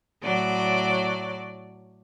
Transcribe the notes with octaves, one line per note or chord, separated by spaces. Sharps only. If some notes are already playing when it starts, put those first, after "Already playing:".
A2 F#3 D5